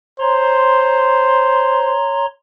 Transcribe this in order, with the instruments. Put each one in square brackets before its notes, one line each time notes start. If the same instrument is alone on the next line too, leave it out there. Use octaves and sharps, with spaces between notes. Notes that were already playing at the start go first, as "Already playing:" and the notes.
[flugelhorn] C5 [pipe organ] C#5 A#5 C6